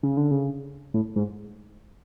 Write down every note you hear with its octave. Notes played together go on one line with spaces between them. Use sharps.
C#3
D3
C#3
A2
G#2